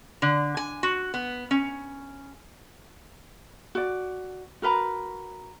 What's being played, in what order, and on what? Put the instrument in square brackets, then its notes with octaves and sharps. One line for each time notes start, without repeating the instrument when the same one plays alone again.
[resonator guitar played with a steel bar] D3
G#5
F#4
B3
C#4
[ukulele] F#4 D5
F#4 A#4 B4 A#5